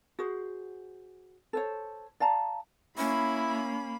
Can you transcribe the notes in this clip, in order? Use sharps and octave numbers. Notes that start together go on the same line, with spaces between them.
F#4 G#4 C5
A4 C5 C#5
D5 F5 A5 A#5
A#3 C#4 E4 B5